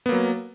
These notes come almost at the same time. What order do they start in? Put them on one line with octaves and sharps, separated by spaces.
B3 A#3 F#3